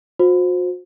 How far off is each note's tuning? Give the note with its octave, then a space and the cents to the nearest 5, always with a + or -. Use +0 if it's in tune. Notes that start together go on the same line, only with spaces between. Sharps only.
F#4 -45 C5 +0